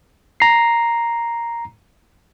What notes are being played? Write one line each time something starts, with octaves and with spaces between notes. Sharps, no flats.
A#5 C7